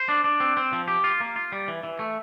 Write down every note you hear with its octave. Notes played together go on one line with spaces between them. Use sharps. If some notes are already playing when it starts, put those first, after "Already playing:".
Already playing: C5
D4
D4
C4
C4
F3
G4
F4
A#3
F4
G3
E3
E3
A3